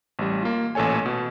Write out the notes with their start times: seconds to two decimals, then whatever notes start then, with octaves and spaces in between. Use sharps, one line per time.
0.19 A1 G3
0.43 A#3 F4
0.75 A1 A#2 A4 C#5 G#5
1.06 B2